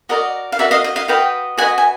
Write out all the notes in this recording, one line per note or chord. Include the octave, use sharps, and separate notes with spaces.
F#4 A#4 D5 D#5
F5
F#4 A#4 D5 E5
D#5 F5
D#5
D#5 F5
F#4 B4 D#5 F5 G5
F#4 B4 D#5 F#5 G#5
G#5